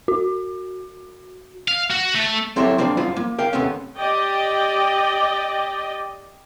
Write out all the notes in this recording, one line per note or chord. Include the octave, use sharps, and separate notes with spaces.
F#4
F5
F#4
A3
F#3 C4 E4 G4 A4 C#5
F3 A#3 C4 D4 A#5 B5
F#2 F3 F4 B5
A#3
G#4 A#4 F5 G5
D#2 C3 A3 B3 C#4
G4 D5 D#5 G5